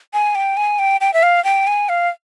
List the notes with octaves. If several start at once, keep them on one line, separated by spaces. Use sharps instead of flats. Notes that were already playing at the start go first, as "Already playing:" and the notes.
G#5
G5
G#5
G5
G5
E5
F5
G5
G#5
F5